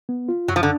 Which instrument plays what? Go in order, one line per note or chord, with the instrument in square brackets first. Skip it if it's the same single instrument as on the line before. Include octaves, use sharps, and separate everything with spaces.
[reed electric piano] B3
F4
[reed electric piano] F#2 [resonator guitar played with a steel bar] F#3
[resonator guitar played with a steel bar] F3
D3